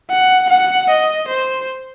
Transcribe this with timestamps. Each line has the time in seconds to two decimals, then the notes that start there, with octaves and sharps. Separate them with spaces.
0.10 F#5
0.50 F#5
0.89 D#5
1.29 C5